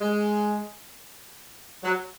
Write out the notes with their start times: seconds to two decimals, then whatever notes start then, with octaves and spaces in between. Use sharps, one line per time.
0.01 G#3
1.84 F#3